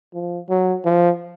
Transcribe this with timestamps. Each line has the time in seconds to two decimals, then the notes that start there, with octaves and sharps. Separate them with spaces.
0.14 F3
0.49 F#3
0.85 F3